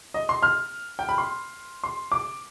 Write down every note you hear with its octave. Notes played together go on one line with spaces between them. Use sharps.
D#5
C6
F6
G5
B5
C6
C6
D6